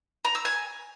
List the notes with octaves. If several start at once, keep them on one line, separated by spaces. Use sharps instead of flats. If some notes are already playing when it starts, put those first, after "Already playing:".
A#5
E6
G#5